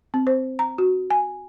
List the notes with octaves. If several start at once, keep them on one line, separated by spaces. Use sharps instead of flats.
C4
C5
A#5
F#4
G#5